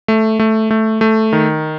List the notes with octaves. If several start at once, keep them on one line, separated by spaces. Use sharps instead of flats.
A3
A3
A3
A3
D#3